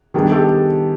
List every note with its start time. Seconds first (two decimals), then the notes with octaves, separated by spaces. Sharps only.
0.14 D#3 G3 B3 D4 G#4
0.31 G4 A4